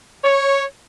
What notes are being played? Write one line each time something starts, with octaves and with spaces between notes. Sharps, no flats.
C#5